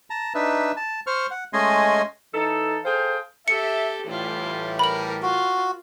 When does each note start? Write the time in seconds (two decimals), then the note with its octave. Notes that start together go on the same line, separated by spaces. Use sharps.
0.10 A5 A#5
0.34 D4 D#4 B4 E5
0.77 A5
1.07 C5 C#6 F6
1.31 F#5
1.53 G#3 A3 C#4 D#5 G#5 C6
2.34 E3 D#4 A4
2.85 G#4 A4 C5 F5 G5
3.48 G4 A4 E5 C#7
4.06 A2 E3 G3 E4 F4
4.79 A#4 B5 F#7
5.22 F4 F#4